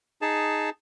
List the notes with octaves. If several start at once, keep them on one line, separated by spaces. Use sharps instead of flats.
D#4 G#4 A5